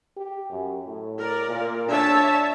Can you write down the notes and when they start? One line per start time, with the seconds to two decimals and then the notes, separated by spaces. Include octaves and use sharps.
0.17 G4
0.50 F#2
0.86 A2
1.18 A#4 D5
1.49 A#2
1.88 D4 C#5 E5 A5